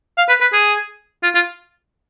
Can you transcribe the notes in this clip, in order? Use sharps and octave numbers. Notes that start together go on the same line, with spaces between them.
F5
B4
B4
G#4
F4
F4